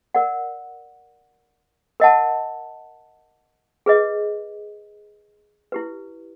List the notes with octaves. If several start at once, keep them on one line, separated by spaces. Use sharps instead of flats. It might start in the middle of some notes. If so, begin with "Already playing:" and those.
A#4 D5 F#5
A#4 D#5 F#5 A5
G#4 B4 D#5
E4 G4 B4